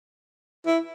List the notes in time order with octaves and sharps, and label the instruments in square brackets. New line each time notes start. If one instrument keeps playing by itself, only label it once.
[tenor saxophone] E4